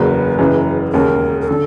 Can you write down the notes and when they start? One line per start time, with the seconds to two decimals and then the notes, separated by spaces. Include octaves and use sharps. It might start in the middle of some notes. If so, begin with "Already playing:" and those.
Already playing: F#1 E2 C#3 F#3 A#3 B4
0.38 F#1 F#2 C#3 E3
0.93 E1 D#2 C#3 A#4
1.41 A#4
1.48 D3 A4